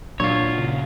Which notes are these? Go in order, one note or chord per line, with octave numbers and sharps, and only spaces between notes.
A#2 F#3 D4 F4 C#5
C#3